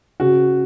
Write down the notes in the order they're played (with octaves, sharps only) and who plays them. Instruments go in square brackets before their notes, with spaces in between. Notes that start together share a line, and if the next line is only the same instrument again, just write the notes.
[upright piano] C#3 F#4